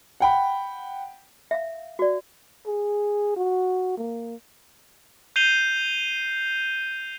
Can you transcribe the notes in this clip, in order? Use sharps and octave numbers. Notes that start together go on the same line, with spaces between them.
F#5 G5 B5
E5 F5
F#4 D5
G#4
F#4
A#3
G6 C7 D#7 F7 G7